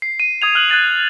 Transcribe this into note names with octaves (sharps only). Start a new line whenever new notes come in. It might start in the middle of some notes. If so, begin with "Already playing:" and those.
C7
D#7
D#6 G#6 F7
F6 F#6 F#7
F#6 G#6 A6 D#7